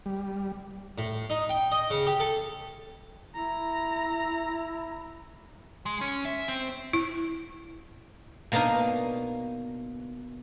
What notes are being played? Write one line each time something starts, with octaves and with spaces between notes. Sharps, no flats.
G3
A2
D#4
G5
D#5
C#3
G4
A4
E4 A#5
G#3
C#4
E5
C4
E4
B2 A#3 D4 D#4 A#4